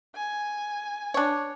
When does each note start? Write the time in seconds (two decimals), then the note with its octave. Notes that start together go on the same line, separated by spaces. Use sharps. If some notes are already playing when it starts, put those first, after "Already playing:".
0.15 G#5
1.14 D4 C#5